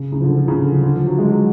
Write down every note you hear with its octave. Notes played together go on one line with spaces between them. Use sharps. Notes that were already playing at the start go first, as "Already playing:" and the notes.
Already playing: C#3
C#3
F3
D3
F3
C#3
D3
F3
D3
F3
F#3
G#3
F#3